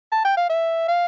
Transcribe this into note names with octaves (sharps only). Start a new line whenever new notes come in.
A5
G5
F5
E5
F5